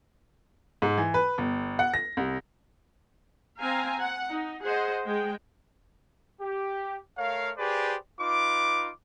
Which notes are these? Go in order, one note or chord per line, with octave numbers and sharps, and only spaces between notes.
G#2
E3
B4
G1
F#5
A#6
C2
C4 F5 G#5 A#5
F#5
D#4
G#4 C5 D#5 F#5
G#3 G5
G4
A3 A#4 C#5 F5
G4 G#4 B4 C5 D5
D#4 F4 B4 D6